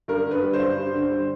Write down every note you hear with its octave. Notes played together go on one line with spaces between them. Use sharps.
G2 A#4
D3
B4
G3
C5
G2
G2
D3
G3